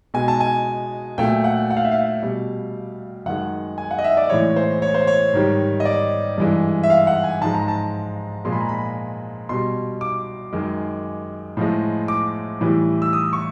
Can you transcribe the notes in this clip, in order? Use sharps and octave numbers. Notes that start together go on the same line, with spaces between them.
B2 G#3 G#5
A5
G#5
A#2 F#3 A3 G5
F#5
F#5
F5
E5
F5
B2 G3
F#2 D#3 G#3 F#5
G#5
F#5
D#5
E5
D5
A2 E3 G#3 C#5
C5
C#5
C5
C#5
G#2 D#3 G3
D#5
D5
G2 E3 G#3
E5
F5
F#5
G#5
G#2 F3 G#3 A5
A#5
A5
A#2 F3 G#3 C6
B5
A#5
B5
B2 G3 C6
D6
F#2 D#3 G#3
A2 F3 G#3
D6
A2 E3 G3
E6
D#6
C#6